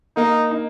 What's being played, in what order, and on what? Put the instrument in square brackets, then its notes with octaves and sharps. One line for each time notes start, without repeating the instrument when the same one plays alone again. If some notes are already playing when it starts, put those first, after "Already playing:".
[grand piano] A#3 [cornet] D#4
[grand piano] D#4